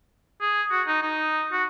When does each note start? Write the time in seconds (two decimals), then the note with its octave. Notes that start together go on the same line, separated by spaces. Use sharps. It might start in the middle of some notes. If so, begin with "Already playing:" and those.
0.41 G#4
0.72 F#4
0.87 D#4
1.02 D#4
1.52 F#4